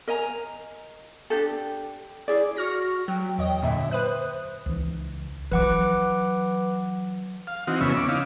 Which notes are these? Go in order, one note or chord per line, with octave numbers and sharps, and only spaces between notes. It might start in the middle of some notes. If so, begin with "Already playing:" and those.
A#4 D#5 G#5 A#5
D4 G4 A4
E4 G#4 D5
F#4 C#6 F6 A#6
F#3 G5
E2 C#5 D#5
F#2 A#2 D3 E5
B4 C5 D#6 F#6
C#2 E3
E3 F#3 B4 F#5 D6
F5
E3 C4 D#4 F#4
F2 C#3 E3 B3 C#4 E5
C#4 D6
D#4 E4 F5